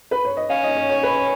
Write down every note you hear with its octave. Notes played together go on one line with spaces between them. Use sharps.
B4
C#5
D#5
C#4 F5
D#5
C#5
C#5
B4